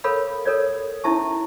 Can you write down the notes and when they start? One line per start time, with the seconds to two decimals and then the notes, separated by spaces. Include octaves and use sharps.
0.04 A4 A#4 C#5 F5 B5
0.45 A4 A#4 C#5 D5
1.04 C#4 D#4 E4 E5 A5 C#6